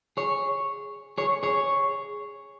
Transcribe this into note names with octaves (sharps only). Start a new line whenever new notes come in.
G#4 C#5
G#4 C#5
G#4 C#5